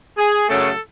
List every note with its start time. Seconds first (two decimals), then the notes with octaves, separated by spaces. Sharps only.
0.18 G#4
0.48 F#2 C#3 F#3 A3 C#4 A4